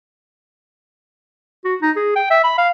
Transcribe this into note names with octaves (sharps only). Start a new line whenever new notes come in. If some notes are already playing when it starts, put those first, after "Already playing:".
F#4
D#4
G#4
G5
E5
B5
F5